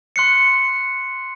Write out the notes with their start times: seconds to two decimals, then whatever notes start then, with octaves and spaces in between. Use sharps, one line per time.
0.16 C6 F#6 C7 C#7